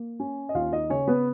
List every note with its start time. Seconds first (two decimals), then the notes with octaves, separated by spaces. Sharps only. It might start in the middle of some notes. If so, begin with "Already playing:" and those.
Already playing: A#3
0.20 C#4
0.49 D#5
0.55 D#2 F4 F5
0.72 D#4 D#5
0.90 C#3 C#4 C#5
1.08 B3 B4